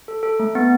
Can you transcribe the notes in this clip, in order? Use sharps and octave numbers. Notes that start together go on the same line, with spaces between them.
A4
A4
A3
B3